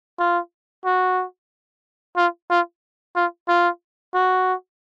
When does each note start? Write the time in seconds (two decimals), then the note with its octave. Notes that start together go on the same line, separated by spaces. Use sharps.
0.19 F4
0.85 F#4
2.17 F4
2.50 F4
3.16 F4
3.49 F4
4.14 F#4